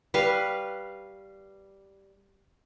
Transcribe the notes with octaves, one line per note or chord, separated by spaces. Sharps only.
G3 B4 F5 C#6